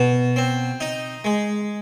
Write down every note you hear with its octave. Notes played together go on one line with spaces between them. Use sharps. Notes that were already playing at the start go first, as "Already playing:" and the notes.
Already playing: B2
C4
D#4
G#3